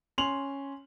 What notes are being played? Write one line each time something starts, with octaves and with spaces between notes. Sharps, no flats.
C#4 C6 F7 F#7